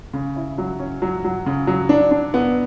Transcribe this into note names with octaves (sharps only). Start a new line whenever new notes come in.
C#3
E4
F#3
C#4
F#3
F#3
C#3
F#3
D4
D4
B3